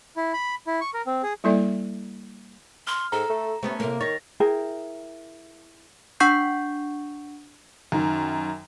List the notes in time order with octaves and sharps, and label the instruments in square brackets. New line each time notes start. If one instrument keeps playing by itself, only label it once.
[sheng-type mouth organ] E4
B5
E4
C#6
A#4
C4
G#4
[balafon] G3 A#3 E4 A4 D5 E5
[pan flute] C6 [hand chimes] F6
[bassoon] G#2 [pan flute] A4 [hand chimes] A#5
[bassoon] A3
[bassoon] C3 [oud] A3 B3 C#4
[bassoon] A2 [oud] C3 A#3 [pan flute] A#4
[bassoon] D#3 [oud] C#5 [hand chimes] A6 A#6
[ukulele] E4 G#4 A#4 G5
[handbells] D4 F#5 C#6 G6 C7
[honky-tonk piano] F#2 D#3